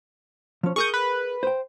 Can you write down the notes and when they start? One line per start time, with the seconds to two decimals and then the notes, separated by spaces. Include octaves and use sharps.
0.63 F3 C#4
0.76 G#4 A#4 C#6 D#6 G6
0.94 B4
1.43 C5 G5